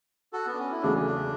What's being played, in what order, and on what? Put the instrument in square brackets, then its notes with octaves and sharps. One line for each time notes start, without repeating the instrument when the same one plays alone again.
[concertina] F#4 A4
B3
D4
C#4
E4
[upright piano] E2 C#3 F#3 A3 [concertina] D4
[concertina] C#4
D4